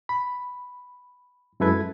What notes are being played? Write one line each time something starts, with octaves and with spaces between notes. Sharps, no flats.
B5
F#2 G#3 E4 A4 B4 G#6